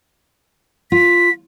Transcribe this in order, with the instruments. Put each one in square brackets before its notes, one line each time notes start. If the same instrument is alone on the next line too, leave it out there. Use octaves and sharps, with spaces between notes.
[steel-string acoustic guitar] F4 [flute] B6